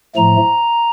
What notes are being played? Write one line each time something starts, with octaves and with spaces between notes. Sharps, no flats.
A2 F3 A3 A#5